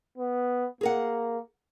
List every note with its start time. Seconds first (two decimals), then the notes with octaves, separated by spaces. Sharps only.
0.18 B3
0.81 A#3 G#4 A#4 F#5